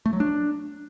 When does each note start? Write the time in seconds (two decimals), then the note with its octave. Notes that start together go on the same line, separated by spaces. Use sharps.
0.06 A3
0.13 F#3
0.20 D4